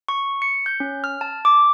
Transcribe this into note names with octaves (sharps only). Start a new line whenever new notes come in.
C#6
C#7
G6
C#4
F6
A5
D6